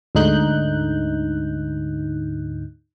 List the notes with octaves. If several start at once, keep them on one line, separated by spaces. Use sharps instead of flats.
D2 G#2 D3 D#4 F#6 G6